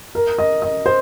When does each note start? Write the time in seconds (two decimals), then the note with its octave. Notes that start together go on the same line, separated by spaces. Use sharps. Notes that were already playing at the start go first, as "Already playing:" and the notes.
0.15 A#4
0.38 D#5
0.62 D#5
0.86 C5